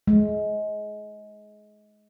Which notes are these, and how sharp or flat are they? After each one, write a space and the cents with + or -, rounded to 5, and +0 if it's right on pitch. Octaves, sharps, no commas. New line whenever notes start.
G#3 +25